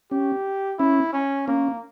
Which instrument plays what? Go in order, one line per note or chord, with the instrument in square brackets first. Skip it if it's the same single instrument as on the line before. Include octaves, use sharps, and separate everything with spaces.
[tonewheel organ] C#4 [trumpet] G4
[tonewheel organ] C#4 [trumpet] E4
[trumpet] C#4
[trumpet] A#3 [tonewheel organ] C#4